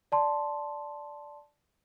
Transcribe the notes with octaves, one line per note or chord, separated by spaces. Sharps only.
D5 A5 C6